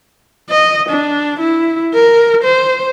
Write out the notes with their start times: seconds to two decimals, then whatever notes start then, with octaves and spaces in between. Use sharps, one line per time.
0.50 D#5
0.89 D4
1.40 E4
1.94 A#4
2.43 C5